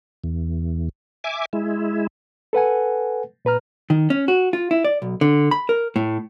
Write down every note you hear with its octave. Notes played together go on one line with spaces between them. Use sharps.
E2
E5 G#5 D6
G#3 E4
A4 B4 F#5 G#5
A#2 B4 A#5 F6
D#3
C#4
F#4
F4
E4
D5
B1
D3
B5
A#4
A2